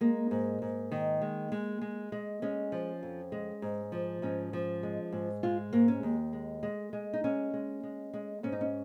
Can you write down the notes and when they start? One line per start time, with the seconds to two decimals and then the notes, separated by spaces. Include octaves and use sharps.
0.01 G#3 A#3
0.31 G#2
0.62 G#2
0.92 D#3
1.22 G#3
1.52 G#3
1.81 G#3
2.12 G#3
2.42 G#3 C#4
2.72 F3
3.03 F2
3.32 G#3
3.62 G#2
3.92 F3
4.22 G#2 C#4
4.53 F3
4.83 G#3
5.12 G#2
5.43 G#3 F4
5.73 G#2 A#3
5.88 C#4
6.03 D#2
6.33 G#3
6.63 G#3
6.93 G#3
7.13 D#4
7.24 G#3 C#4
7.54 G#3
7.83 G#3
8.14 G#3
8.43 G#2 C#4
8.52 D#4
8.61 C#4